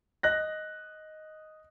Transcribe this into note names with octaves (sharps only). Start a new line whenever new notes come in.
D#5 F#6 A#6